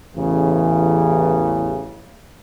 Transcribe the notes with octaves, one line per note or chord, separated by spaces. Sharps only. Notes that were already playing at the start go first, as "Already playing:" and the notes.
A1 E2 C#3 E3